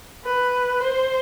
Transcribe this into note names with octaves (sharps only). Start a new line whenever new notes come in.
B4
C5